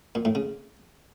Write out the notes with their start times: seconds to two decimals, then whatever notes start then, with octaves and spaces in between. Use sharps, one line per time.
0.15 A#2
0.25 A2
0.35 C#3